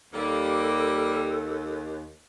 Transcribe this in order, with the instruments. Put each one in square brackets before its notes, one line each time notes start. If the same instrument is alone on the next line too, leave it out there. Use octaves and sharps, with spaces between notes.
[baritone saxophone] D#2 [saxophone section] G3 A#3 [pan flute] A4